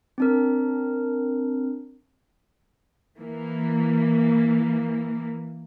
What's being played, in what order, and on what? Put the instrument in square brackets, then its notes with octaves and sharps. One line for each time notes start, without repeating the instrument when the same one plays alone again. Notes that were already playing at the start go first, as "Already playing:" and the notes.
[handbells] C4 D4 A#4
[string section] E3 A#3